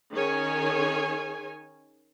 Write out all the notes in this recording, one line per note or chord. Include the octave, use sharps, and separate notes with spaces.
D#3 C#4 G#4 C#5 G#5